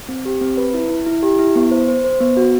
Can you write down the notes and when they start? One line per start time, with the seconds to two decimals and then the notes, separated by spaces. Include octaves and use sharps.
0.09 C4
0.25 G4
0.41 C4
0.57 B4
0.74 E4
0.90 E4
1.06 E4
1.23 G4
1.39 E4
1.56 B3
1.71 C5
1.88 C5
2.04 C5
2.20 B3
2.37 F#4